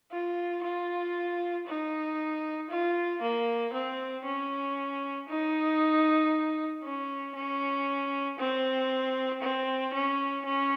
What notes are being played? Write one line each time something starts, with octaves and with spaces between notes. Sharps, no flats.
F4
F4
D#4
F4
A#3
C4
C#4
D#4
C#4
C#4
C4
C4
C#4
C#4